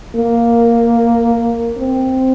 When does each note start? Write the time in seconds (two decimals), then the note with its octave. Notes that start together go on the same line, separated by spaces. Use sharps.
0.16 A#3
1.78 C4